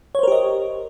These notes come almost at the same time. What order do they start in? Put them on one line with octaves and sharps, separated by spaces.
C#5 C5 A#4 G4 D#5